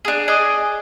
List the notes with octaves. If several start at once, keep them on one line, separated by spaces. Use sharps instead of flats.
D4 G#4
G#4 D5 D#5